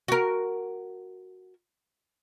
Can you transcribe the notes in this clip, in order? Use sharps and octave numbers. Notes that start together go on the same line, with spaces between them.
F#4 A#4